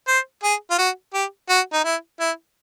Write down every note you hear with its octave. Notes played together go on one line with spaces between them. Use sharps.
C5
G#4
F4
F#4
G4
F#4
D#4
E4
E4